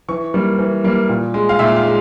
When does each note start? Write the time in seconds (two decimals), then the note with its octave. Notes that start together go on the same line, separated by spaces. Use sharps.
0.08 E3 C#6
0.34 G3 A#3
0.58 E3
0.84 G3 A#3
1.09 A#2
1.34 G#3
1.49 F5
1.59 A#2 E5
1.76 F5
1.85 G#3